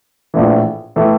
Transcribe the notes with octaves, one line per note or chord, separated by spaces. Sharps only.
A#1 A2 E3
A2 E3